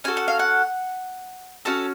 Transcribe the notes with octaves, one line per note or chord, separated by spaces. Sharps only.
C#4 F#4 A4 G#5
F#5
F5
F#5
C#4 F#4 A4 A5